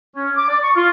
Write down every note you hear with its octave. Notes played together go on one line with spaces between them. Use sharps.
C#4
D6
D5
C#6
F4